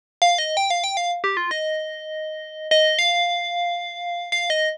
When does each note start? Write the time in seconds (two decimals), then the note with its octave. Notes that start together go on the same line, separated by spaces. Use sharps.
0.22 F5
0.38 D#5
0.57 G5
0.70 F5
0.84 G5
0.97 F5
1.24 G4
1.37 F4
1.51 D#5
2.71 D#5
2.99 F5
4.32 F5
4.50 D#5